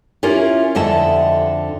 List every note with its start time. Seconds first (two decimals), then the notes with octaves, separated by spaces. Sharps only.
0.23 C#4 E4 F4 G4 A#4
0.75 F2 D3 D#5 E5 A5